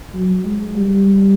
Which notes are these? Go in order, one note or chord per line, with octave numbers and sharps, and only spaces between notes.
F#3
G#3
G3